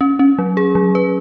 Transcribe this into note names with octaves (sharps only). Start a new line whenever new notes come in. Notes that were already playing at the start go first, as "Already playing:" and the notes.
C#4
C#4
F#3
G#4
F#3
B4